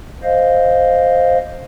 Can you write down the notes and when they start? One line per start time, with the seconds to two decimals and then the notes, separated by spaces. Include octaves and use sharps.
0.23 C5 D#5 F5